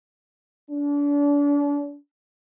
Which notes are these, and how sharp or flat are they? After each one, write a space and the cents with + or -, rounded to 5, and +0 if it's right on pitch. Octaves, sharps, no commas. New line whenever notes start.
D4 -35